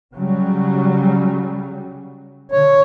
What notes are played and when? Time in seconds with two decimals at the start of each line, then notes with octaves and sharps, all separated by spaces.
0.15 C#3 F#3 G3
2.52 D3 C#5